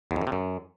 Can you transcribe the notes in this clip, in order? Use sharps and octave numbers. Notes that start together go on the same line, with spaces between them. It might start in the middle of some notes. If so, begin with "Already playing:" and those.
E2
F2
F#2
C3
F#2